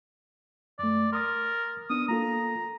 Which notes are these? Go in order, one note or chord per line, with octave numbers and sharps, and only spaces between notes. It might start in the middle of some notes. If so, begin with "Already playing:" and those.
F#2 A3 D5
A#4 C6 D#6 A6
B3 D4 D#6
A#3 F4 A4 A#5